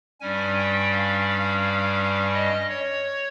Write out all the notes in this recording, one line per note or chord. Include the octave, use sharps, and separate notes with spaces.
G2 G3 C#4 G#5
G5
F5
F5
D#5
C#5